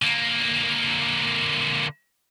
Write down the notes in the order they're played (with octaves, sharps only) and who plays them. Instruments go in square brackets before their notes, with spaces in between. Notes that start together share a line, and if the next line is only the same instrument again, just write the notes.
[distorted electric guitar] D3 A#3